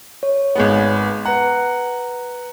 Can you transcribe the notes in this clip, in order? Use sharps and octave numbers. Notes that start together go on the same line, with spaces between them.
C#5
G#1 G#3 B3
B4 F#5 A#5